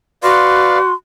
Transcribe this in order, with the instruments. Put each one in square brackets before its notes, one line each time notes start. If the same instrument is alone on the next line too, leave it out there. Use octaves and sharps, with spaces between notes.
[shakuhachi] F#4 [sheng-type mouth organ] B4 D5 F5 [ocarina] C6